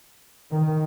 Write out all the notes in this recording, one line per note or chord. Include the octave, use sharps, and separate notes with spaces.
D#3